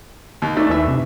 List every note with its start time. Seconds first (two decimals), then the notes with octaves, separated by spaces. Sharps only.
0.42 D#2
0.57 A3 D4 D#4
0.69 D#2 E3 E5
0.88 C3